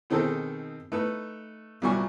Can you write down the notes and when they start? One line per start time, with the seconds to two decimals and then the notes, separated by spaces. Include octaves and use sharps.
0.10 B2 D#3 C4 D#4 G#4 A4
0.92 A3 D#4 B4
1.82 C2 A#2 F#3 G3 G#5 C#6